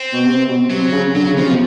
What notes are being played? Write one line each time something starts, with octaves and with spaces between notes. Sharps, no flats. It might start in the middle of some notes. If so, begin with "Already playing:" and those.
Already playing: C4
B2
C3
B2
C3 F#3
C#3
D3 F#3
C#3
C3 F3
B2